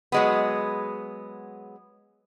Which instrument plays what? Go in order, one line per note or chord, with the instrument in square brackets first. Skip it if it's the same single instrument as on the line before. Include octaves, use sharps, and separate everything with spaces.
[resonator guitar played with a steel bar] F#3 G#3 B3